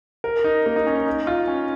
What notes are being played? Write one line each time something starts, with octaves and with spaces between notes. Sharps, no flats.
A#4
D#4
A#3
D#4
C#4
D#4
D#4
F4
C#4